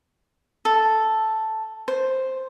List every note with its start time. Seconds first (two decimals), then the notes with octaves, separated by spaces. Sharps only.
0.65 A4
1.88 C5